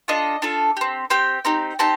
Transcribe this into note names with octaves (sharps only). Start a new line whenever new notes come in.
D4 F4 A4 D#5
D4 F4 A4
C4 G4
C4 G4 G5
C4 D#4 G4
C4 D#4 G4 A5